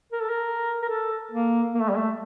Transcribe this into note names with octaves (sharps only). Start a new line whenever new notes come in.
A#4
A4
A#4
A#4
A4
A#3
A#3
A3
G3
A3